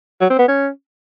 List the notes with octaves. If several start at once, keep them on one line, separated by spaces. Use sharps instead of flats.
F#3
C4
B3
C#4